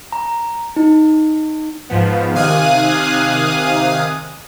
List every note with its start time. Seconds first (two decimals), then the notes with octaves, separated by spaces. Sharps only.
0.12 A#5
0.76 D#4
1.90 G#2 F3 B3
2.34 C3 D#3 F5 G#5 D#6 F#6